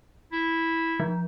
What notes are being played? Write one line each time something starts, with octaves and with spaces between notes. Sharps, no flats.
E4
F3